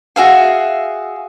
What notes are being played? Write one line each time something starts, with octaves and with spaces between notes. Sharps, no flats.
F#4 G#4 E5 F5